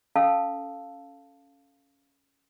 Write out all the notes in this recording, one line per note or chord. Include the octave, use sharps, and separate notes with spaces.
C#4 A4 F5 A5 E6